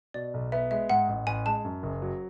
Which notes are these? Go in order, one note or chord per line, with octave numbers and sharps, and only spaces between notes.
B2 D5
B1
B3 E5
G#3 E5
G#2 F#5
A1
A1 G#5
G#3 A5
F#2
F#1
F#3